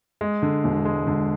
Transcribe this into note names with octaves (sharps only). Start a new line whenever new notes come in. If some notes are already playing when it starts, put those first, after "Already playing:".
G#3
D3
E1
G#3
D3